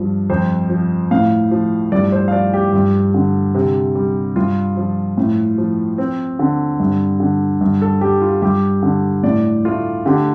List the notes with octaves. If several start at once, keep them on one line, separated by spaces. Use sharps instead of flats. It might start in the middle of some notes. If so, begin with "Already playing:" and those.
Already playing: G2 F3 G3
F2 C5
F3
A2 F5
F3
G2 D5
C5
F5
F3 D5
G4
G2
D3
C3
G3
G2 F4
F3
A2
F3
C4
D3
G2
D3
G2
A4
G3 G4
F4
G2 G4
D3
A2 D5
A3 F4
D3 G4